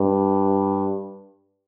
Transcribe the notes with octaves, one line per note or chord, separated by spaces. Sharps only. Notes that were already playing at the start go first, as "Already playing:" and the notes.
Already playing: G2